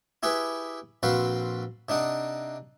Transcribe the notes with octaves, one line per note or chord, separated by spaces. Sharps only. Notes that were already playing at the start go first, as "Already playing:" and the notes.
E4 G4 G#4 B4
A#1 C4 F#4 B4 C5 F5
C3 D4 D#4 F#5